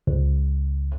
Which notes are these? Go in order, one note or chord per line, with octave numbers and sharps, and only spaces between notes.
C#2